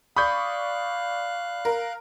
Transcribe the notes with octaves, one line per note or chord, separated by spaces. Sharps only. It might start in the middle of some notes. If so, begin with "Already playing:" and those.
D5 F5 B5 C#6 D#6 F#6 G6
A#4